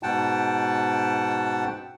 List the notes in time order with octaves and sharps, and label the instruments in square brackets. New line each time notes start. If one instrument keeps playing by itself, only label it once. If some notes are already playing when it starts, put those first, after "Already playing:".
[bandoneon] G#2 B2 F#5 G5 A5